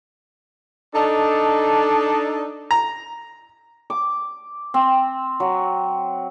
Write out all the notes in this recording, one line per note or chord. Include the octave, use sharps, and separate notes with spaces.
D4 D#4 A4
A#5
D6
C4
F#3